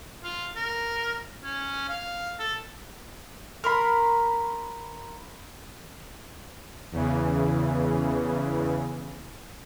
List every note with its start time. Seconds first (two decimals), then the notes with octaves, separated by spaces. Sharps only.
0.23 F4
0.56 A#4
1.44 C#4
1.88 F5
2.39 A4
3.64 A#4 B5 C6 F6
6.92 E2 C#3 E3